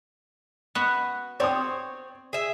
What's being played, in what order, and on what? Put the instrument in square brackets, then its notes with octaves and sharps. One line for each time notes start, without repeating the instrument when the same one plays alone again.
[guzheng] B3 F#4
[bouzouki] C4 C#5 [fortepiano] D5 C6 D#6
[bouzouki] G#4 E5